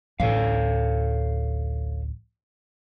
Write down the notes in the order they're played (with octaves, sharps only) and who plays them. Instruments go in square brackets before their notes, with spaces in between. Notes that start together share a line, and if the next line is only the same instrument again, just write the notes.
[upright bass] A1 D2 [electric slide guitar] A4 C#5 F5